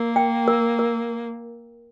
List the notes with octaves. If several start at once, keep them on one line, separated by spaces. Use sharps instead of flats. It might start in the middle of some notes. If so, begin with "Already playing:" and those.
Already playing: A#3 A#4
G5
A#4
A#4